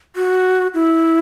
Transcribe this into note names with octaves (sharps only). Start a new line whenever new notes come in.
F#4
E4